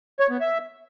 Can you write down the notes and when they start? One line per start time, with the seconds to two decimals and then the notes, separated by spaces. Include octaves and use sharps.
0.20 C#5
0.30 B3
0.41 E5